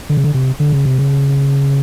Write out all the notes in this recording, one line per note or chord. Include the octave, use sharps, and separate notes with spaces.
D3
C#3
D3
C3
D3
C#3
C3
C#3